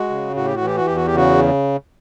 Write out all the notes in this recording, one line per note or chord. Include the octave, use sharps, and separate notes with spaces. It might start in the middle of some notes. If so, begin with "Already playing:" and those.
Already playing: G#3 F#4
C#3
A2 F#4
G4
F#4
E3 G4
F#4
E2 G4
F#4
G4
C#3 F#4